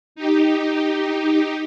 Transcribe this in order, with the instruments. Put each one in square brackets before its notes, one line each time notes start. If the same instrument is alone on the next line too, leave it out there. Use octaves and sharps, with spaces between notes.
[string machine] D#4 G4